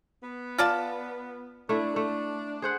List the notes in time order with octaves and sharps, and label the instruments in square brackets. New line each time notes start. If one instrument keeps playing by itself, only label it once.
[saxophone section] B3
[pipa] F4 D5 A5
[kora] A3 E4 [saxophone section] D4
[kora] A3
G#4 C5 F#5